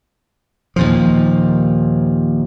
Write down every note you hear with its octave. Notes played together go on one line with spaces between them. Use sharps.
D#2 A#2 F3